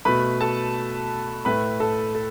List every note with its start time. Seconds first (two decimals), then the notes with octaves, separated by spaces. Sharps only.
0.05 B2 A3 B4 B5
0.41 A4 A5
1.45 A2 A3 B4 B5
1.80 A4 A5
2.15 A4